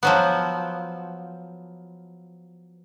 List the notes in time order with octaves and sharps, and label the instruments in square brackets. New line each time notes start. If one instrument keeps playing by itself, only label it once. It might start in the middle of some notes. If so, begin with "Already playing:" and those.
[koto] F3 F#3 B3